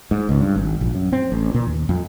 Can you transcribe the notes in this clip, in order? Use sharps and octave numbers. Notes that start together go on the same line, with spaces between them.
G#2
C#2
G2
G#1
A#1
F#2
C4
A1
A#2
D#2
F2